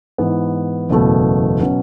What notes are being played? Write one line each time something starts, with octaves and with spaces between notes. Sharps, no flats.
G#2 E3 B3
F#1 E2 B2 A3
B2 F#3 C#4